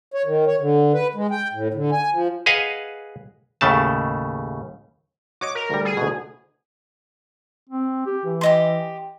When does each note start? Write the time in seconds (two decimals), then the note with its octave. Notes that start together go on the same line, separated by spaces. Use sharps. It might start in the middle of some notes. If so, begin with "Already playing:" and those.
0.14 C#5
0.25 D#3
0.47 C#5
0.60 D3
0.93 B4
1.15 G#3
1.31 G5
1.53 A2
1.74 D3
1.92 G#5
2.11 F3
2.46 G#4 B4 D#5 F5 F#5 G#5
3.61 D#2 A2 C#3 A3 A5
5.41 F#4 C#5 D#5 D6
5.55 A#4
5.70 D2 G3
5.85 G#4
5.97 D2 B2
7.70 C4
8.06 G4
8.25 E3
8.41 G4 D#5 C6